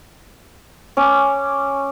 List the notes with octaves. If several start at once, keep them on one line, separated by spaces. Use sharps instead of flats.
C#4 D6